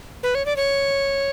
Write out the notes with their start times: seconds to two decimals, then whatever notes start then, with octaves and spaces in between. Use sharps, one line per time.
0.23 B4
0.35 C#5
0.46 D5
0.56 C#5